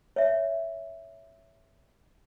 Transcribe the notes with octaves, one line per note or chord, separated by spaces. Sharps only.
C#5 D5 E5